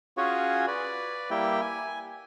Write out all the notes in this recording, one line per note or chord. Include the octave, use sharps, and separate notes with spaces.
C#4 F4 F#4 G#4 C#5
B4 D5
G3 A#3 E4 G4 G5
G#5